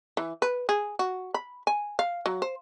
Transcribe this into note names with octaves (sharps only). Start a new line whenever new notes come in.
E3
B4
G#4
F#4
B5
G#5
F5
F#3
C5